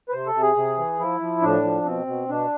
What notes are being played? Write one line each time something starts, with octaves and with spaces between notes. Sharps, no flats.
B4
C3 C5
A4
C3
G#4
C3
E3
F3 E4
F3
A2 D4
F3
B2 C4
B2
B2 D4